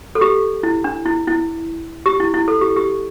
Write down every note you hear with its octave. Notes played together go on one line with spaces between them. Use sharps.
A4
G4
E4
D4
E4
E4
G4
E4
E4
A4
G4
G4